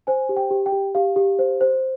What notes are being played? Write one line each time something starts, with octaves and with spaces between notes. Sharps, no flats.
C5 G#5
G4
G5
G4
G5
G4
G4 F5
G4
C5
C5